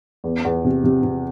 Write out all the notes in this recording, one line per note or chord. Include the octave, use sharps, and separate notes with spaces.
E2
E2
C3
C3
C3